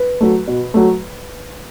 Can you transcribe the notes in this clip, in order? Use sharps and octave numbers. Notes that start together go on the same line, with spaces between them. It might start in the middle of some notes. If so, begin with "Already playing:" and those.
Already playing: B4
F#3 A3
B2
F#3 A3